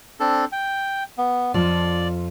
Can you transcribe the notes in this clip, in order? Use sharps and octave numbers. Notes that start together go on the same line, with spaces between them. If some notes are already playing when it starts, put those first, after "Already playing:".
C4 D4 A4
G5
B3
F2 F4 A4 D5